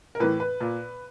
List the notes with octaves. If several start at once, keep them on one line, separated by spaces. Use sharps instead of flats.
A#4
A2 E3 B4
B4
A#2